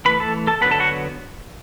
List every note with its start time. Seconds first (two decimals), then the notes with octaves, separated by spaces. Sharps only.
0.05 E3 A3 B4 B5
0.20 A4 A5
0.47 A4 A5
0.61 D3 F#3 B3 B4 B5
0.71 A4 A5
0.80 F#4 F#5